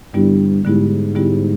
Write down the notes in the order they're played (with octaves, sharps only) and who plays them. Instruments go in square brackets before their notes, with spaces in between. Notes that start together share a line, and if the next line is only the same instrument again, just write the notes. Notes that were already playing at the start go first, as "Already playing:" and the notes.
[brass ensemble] G2 [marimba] D3 G3 B3 E4 G4
[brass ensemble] G#2 [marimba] D3 G3 B3 E4 G4
[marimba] D3 G3 B3 E4 G4